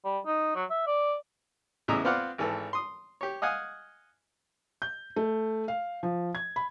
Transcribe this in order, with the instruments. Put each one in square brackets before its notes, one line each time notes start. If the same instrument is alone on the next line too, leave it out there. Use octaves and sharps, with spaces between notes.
[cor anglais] G3
D#4
F#3
E5
D5
[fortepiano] E2 A2 C#3 D#5 E5 A#5
B3 C4 F4 D5 F5 F#5
G#1 E3 A4
C6 D#6
G4 C#5
D#5 F5 F#5 G#5 D#6
[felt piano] G6
A3
F5
F3
G#6
B5